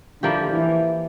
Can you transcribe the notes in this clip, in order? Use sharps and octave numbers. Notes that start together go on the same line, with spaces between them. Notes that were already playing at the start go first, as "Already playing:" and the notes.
D3 F3 A#3 E4 G4
E3